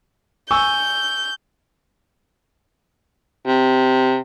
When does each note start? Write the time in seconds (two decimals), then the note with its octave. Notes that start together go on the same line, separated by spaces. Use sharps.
0.51 G#5 C#6 E6 G6
3.47 C3